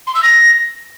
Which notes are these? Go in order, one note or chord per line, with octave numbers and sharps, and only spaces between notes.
C6
E6
A#6